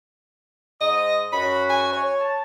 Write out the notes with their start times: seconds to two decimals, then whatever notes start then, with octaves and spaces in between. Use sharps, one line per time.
0.81 G#2 D#5 D#6
1.33 F#2 C#4 F#4 B5
1.70 G#5
1.93 C#5
2.20 A5